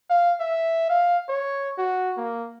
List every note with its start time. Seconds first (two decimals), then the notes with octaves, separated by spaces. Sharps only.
0.10 F5
0.40 E5
0.90 F5
1.29 C#5
1.78 F#4
2.17 A#3